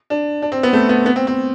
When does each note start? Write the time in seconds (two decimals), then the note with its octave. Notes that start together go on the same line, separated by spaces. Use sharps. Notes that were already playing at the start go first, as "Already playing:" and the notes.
0.10 D4
0.42 D4
0.52 C4
0.63 B3
0.73 A3
0.89 B3
1.06 B3
1.16 C4
1.27 C4